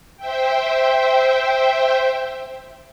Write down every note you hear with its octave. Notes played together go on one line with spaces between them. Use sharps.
C5 E5 G5